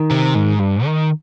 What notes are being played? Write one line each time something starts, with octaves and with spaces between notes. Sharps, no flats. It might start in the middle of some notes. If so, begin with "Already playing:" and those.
Already playing: D#3
C3
G#2
G2
D#3